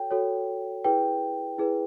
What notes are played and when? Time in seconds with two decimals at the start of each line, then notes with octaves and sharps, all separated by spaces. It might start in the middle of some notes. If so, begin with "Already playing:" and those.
Already playing: F#4 A4 C#5 G5
0.11 F#4 A4 C#5
0.84 E4 G#4 B4 G5
1.58 E4 G#4 B4